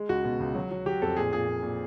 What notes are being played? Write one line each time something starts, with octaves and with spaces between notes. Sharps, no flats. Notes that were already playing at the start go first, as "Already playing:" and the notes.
Already playing: G#3
C#2 F#4
B2
C#2
F#3
F#3
F#3 G4
F2 A4
A#2 G#4
A#2 G#4
A#2
A#2